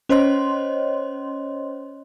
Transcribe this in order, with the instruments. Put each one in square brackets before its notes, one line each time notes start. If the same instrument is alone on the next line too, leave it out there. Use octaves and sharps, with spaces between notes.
[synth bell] C#4 C5 C#5 D#5 C6